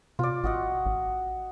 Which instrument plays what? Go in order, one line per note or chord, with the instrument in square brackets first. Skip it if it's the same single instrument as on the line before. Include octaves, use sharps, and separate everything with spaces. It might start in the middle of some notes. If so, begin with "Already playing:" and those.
[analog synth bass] C3 [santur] F4 D5
[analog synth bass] A1 [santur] F#4 D#5 F#5
[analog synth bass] A1